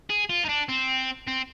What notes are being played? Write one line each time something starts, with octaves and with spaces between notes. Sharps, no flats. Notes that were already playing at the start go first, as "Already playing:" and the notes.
G#4
F4
D#4
D4
C4
C4